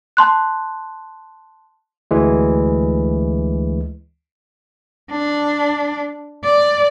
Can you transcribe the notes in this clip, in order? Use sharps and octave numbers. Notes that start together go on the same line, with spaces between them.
A5 C6 F#6
D2 E3 G#3
D4
D5